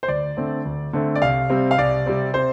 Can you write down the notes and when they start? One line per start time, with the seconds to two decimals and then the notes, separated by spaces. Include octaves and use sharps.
0.03 C5
0.08 D2 D5
0.37 D3 A3 C4
0.65 D2
0.93 D3 A3 C4
1.15 D5
1.21 C2 F5
1.50 C3 G3 C4
1.71 F5
1.78 C2 D5
2.06 C3 G3 C4
2.34 C3 C5